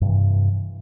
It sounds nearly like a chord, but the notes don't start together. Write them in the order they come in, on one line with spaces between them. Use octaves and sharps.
G2 C3 E3